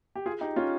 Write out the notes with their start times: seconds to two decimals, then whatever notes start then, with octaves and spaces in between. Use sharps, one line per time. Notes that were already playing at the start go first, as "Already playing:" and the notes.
0.16 G4
0.26 F4 G#4
0.41 D#4 G4
0.56 C#4 F4